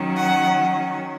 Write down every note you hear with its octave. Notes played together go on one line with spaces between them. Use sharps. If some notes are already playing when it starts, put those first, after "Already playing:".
Already playing: D#3 F#3 C#4
F#5